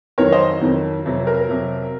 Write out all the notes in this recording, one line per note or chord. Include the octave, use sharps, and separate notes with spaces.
F2 D#3 F#3 A#4 C#5
C5 D#5
F2 D#3 F#3
F2 C3 F#3
A#4
F2 C3 F#3